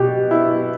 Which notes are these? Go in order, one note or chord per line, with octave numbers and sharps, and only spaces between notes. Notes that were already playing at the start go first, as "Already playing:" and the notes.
Already playing: B2 G4
E4